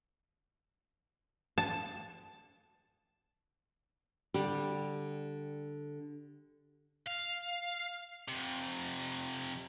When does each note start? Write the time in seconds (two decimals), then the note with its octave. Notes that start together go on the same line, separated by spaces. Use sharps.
1.58 A5
4.34 D3 G3
7.06 F5
8.28 F2 C3